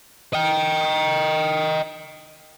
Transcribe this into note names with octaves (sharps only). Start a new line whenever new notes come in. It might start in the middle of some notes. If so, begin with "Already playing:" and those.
D#5 G5